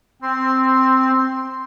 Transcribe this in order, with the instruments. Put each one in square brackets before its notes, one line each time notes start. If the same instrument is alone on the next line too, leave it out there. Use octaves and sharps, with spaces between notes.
[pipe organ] C4 [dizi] C6